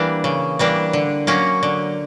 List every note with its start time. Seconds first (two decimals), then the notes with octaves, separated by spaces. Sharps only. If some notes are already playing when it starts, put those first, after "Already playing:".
Already playing: E3 G3 A#3 D4
0.24 C#3
0.59 E3 G3 A#3 D4
0.93 D3
1.27 F#3 A#3 C#4
1.63 D3